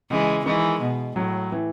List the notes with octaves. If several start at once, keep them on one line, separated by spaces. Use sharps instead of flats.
C#3 E3 G#3
D#3 E3 G#3
B2
A2 F#3
E3